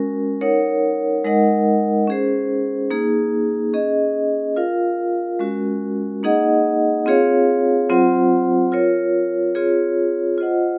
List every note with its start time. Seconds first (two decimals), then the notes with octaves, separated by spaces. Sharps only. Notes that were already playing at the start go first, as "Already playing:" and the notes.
Already playing: G#3 C#4 F#4 A#4
0.41 D#4 A#4 C#5 F#5
1.24 G#3 D#4 A#4 D#5 F#5
2.08 C#4 G#4 C5
2.91 A#3 D#4 G#4
3.73 C#4 G#4 D#5
4.56 F4 A#4 F5
5.39 G#3 C#4 F#4 A#4
6.23 A#3 D#4 G#4 D#5 F#5
7.06 C4 F4 G#4 C#5 F5
7.89 F#3 C4 F4 C5 F#5
8.72 F4 A#4 C#5
9.55 C4 F4 G#4 C#5
10.38 F4 C5 D#5 F#5